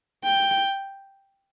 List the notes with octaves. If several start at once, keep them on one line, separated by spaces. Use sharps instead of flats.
G5